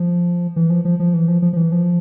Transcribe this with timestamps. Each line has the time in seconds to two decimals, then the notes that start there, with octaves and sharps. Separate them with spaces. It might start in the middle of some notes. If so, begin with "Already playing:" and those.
Already playing: F3
0.56 E3
0.70 F3
0.85 F3
0.99 F3
1.14 E3
1.28 F3
1.42 F3
1.53 F3
1.57 E3
1.72 F3